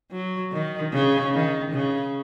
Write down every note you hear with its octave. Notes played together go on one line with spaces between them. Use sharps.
F#3
D#3
C#3
D#3
C#3